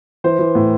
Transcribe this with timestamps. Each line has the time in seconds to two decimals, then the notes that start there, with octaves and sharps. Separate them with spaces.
0.24 E3 C5
0.39 E3
0.55 A2